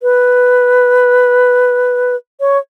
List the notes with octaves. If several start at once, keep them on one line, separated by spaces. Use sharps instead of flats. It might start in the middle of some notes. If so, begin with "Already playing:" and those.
B4
C#5